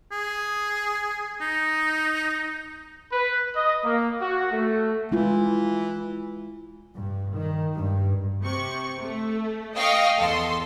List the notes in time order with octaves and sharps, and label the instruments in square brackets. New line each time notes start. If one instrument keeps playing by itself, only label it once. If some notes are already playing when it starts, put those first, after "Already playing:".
[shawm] G#4
D#4
[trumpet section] B4
D#5
A#3
F#4
A3
[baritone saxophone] E3 [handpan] G#3 E4 F4
[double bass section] G2
D#3
G2
[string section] C3 C#6
A3
D#5 F5 G5 C#6
E2 A4 C6